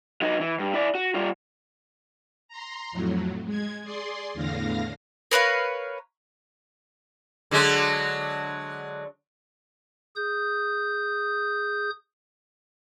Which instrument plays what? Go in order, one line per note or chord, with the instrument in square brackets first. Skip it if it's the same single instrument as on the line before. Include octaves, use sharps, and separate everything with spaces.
[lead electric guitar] F#3 D#4
E3
G2
E4 D5
F#4
G3 F4
[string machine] A#5 C6
F2 A2 F#3
G#3 G#6
G#4 D5 C6
E2 A2 D3 F5 A#6
[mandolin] A#4 B4 C#5 F5
[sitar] D3 F#3 G#3
[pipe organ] G#4 D#6 G6